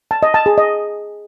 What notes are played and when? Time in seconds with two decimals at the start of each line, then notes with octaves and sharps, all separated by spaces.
0.11 A5
0.23 D#5
0.34 A5
0.46 G#4
0.58 D#5